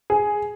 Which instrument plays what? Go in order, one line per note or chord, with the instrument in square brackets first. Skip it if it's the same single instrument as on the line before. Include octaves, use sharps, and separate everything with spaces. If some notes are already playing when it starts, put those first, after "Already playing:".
[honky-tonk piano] G#4